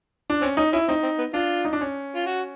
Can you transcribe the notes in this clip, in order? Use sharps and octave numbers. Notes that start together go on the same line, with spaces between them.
D4
C4 C#4
C#4 D#4
C#4 E4
C4 D#4
C4
B3
D4 F4
D#4
D4
C#4
F4
F#4